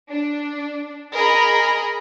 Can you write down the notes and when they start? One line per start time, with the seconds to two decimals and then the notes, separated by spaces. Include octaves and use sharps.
0.11 D4
1.15 G#4 A#4 D#5 A#5 B5